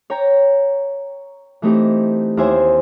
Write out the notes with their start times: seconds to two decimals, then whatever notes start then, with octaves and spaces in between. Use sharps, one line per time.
0.10 C#5 G5 A#5
1.62 E3 A3 C4 D#4 G4
2.37 D#2 E4 C5 E5 G#5